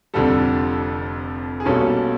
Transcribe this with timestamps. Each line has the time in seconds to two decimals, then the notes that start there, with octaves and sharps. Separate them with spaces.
0.14 F1 F2 D3 G3 A4
1.60 G#4
1.65 B1 B2 G3 A#3 C#4 A4